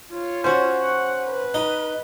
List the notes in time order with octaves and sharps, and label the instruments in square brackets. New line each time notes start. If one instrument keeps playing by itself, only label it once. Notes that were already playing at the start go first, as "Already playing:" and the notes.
[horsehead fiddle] F4 C#5
[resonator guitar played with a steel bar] C#4 F#4 [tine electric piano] C5
[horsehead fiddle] F#5
B4
[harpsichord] D#4